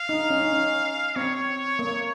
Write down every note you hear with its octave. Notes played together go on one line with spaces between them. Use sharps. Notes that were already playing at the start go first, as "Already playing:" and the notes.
Already playing: F5
D#4
C#4
D#4
C#4
C4 C#5
A#3